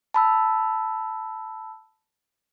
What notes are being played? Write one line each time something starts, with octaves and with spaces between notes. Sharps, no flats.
A5 B5 E6